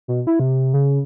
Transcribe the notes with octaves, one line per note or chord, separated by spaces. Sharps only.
B2
E4
C3
C#3